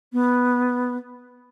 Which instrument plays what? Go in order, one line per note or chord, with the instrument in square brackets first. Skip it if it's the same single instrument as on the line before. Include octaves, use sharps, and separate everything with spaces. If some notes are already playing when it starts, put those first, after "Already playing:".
[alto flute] B3